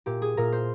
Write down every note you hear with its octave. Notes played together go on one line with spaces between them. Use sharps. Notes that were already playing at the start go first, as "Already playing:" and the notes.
A#2 G4
G#4
A#2 A#4
C5